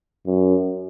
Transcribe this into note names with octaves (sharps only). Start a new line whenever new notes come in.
F#2